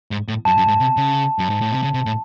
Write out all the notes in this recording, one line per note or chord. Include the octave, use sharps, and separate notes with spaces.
G#2
A2
F#2 A5
F#2
G#2
C3
C#3
F#2
G#2
A2
C3
C#3
C3
A2